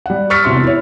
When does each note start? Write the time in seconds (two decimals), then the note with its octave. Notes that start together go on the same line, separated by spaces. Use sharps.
0.06 G3 F#5
0.30 C#6 E6 F6 A6 B6 C#7
0.44 E1 E2 C3 F#4 C6
0.64 E4 C#5